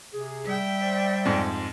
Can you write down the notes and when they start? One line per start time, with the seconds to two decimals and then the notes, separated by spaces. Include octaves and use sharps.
0.13 C3 G#4
0.45 G3 E5 G5
0.81 C5 D5
1.25 F2 G#2